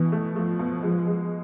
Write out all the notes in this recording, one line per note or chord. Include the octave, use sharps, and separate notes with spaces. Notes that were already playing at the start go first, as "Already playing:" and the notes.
Already playing: B2 E3
A3
F3 A3
B2
G#3
G#3